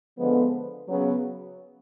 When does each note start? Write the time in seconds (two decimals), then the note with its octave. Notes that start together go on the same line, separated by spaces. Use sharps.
0.18 D3 F3 G#3 B3
0.88 C#3 F#3 B3